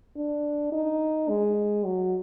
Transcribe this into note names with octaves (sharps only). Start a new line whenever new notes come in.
D4
D#4
G#3
F#3